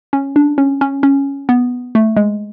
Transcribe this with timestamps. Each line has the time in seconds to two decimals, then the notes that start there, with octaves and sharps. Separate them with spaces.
0.13 C#4
0.36 D4
0.58 C#4
0.81 C#4
1.03 C#4
1.49 B3
1.95 A3
2.17 G#3